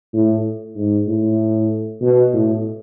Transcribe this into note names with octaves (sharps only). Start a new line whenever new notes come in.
A2
G#2
A2
B2
A2